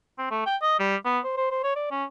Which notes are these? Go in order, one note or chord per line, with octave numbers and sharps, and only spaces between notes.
C4
A3
G5
D#5
G3
B3
C5
C5
C5
C#5
D5
C#4